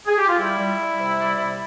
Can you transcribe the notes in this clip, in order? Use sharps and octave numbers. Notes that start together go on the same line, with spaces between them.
G#4
G4
F4
G3 E4
G3
G3
C3
G3
C3